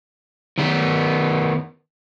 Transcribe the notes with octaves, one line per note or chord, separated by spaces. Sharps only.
D#3 B3